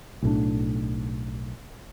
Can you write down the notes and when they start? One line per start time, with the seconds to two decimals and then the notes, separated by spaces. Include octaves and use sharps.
0.22 B1 A2 D4